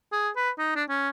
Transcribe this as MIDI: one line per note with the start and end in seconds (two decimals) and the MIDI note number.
0.12 0.29 68
0.36 0.50 71
0.58 0.74 63
0.75 0.84 62
0.89 1.09 61